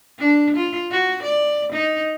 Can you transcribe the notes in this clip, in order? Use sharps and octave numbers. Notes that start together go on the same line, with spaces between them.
D4
F4
F#4
D5
D#4